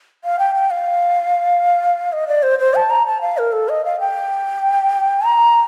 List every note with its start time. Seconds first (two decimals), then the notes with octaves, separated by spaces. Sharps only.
0.24 F5
0.39 G5
0.55 G5
0.71 F5
2.13 D#5
2.28 D5
2.43 C5
2.59 C5
2.75 A5
2.90 A#5
3.06 A5
3.21 F5
3.38 A#4
3.52 A4
3.69 D#5
3.85 F5
4.00 G5
5.25 A#5